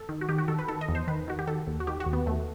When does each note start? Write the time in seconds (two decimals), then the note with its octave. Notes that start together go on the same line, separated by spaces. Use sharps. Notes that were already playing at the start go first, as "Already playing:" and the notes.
Already playing: A4
0.09 D#3
0.21 F#4
0.29 D#3 G4
0.38 F#4
0.48 D#3 A4
0.59 B4
0.68 D#3 A4
0.81 D#5
0.89 E2
0.95 C5
1.08 D#3 B4
1.28 D#3 F#4
1.39 G4
1.47 D#3 A4
1.67 D#2
1.80 F#4
1.87 D#3 G4
2.00 F#4
2.06 D#2
2.13 B3
2.26 D#2 A3